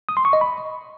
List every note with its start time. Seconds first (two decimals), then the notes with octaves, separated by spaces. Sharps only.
0.09 D#6
0.17 C6
0.25 C#6
0.33 D#5
0.41 B5